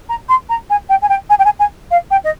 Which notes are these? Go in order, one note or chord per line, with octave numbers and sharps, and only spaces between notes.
A#5
C6
A#5
G#5
G5
G#5
G5
G#5
G5
G#5
G#5
F5
G5
D#5